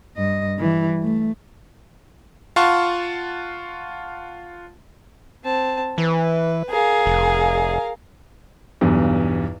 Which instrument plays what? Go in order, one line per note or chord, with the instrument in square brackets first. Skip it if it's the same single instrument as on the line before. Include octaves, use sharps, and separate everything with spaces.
[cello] G2 D#5
E3 G3
A3
[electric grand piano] F4 F5 F#5 A5 C6 C#6
[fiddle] C4 A5
[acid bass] E3 [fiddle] B4
[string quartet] G#4 [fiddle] A#4 F5
[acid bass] F1
[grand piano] B1 E2 G2